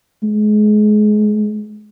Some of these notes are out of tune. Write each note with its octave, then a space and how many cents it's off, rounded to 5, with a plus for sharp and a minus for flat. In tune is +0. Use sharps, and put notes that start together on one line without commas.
G#3 +30